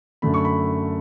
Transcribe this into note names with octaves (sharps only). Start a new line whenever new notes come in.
F#2 D3 A3 B5
C#6
B5